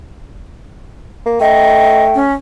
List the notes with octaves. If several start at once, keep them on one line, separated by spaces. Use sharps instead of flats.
A#3
A3 D#5 G5
C#4